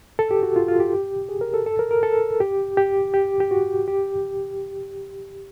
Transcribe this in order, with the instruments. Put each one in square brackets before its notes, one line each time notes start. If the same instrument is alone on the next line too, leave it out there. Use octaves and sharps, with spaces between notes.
[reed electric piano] A4
G4
F#4
F4
F4
G4
G#4
A#4
A4
A4
A#4
A#4
A4
G4
G4
G4
G4
F#4
G4